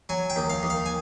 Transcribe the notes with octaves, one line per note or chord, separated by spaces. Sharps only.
F#3 G#5
G5
D#2
F5
D#2
F5
G#5